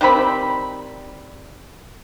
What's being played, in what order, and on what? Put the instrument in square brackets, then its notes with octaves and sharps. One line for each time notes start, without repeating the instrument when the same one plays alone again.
[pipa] D#3 G3 C4 B5